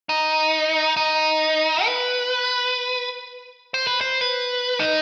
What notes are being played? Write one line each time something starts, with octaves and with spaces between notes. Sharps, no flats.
D#4
D#4
B4
C5
B4
C5
B4
D#4